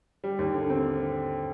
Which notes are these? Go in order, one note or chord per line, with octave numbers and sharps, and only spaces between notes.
G3
D#2
D3
C4